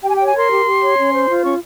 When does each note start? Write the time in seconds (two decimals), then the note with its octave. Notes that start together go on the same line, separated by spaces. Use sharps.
0.03 G4 G5
0.10 G#5
0.16 C#5 G5
0.27 G#5
0.35 A#4 C6
0.50 G4
0.66 G4
0.82 C#5
0.97 C#4
1.13 C5
1.29 F4
1.44 C#4 C#6